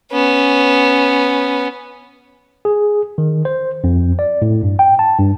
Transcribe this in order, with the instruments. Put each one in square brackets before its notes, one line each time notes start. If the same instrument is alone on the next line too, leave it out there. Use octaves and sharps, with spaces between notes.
[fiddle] B3 C#4
[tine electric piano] G#4
D#3
C5
F2
D5
A2
G2
G5
A5
G2